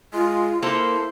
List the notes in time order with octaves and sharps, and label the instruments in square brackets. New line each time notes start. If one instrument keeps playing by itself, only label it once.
[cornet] G#3 [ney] F4
[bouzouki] A#3 A4 [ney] E4 [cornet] C5